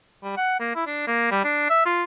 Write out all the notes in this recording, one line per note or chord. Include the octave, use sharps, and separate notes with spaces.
G3
F#5
A#3
E4
D4
A#3
G3
D4
E5
F4